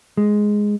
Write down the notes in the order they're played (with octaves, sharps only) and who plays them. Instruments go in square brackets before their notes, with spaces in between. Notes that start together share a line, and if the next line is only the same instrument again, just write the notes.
[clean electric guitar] G#3